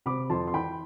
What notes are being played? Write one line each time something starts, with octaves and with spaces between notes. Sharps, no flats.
C3 B5 D6
F2 A5 C6
C6
E3 G5 B5